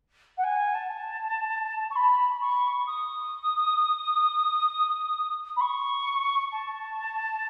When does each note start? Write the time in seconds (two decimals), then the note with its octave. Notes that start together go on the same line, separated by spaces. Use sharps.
0.37 F#5
0.44 G#5
0.74 A5
1.91 C#6
1.96 B5
2.41 C#6
2.87 D#6
5.56 B5
5.61 C#6
6.52 A5